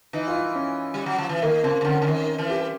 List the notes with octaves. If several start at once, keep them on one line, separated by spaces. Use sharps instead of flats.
E3 D#4
F4
E4
C#4
G3
F#3
F3
E3
D#3 A#3
C#3 C4
C#3
D3 C#4
D3
D#3
E3
G4